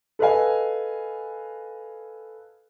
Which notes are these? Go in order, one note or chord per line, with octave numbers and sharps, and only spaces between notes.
A4 B4 D#5 F5 G#5